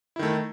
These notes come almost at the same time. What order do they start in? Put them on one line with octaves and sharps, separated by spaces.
E4 D#3 A3